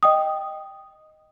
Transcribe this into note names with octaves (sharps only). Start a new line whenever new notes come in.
D#5 G5 D#6